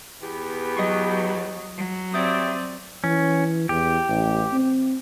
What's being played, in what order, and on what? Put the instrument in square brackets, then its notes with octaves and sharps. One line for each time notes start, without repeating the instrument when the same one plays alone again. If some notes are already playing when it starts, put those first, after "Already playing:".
[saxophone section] E2 B3 G4
[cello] F#3 [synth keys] D#5 C#6
[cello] F#3
[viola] C4 D5 [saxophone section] G4 C#5 E5 [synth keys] D#6 G6 A6
[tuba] E3 [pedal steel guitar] C#4
[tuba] E2 [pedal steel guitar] G4
[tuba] A1
C4